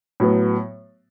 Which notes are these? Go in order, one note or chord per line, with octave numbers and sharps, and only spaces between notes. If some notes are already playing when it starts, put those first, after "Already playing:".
A2 F#3 B3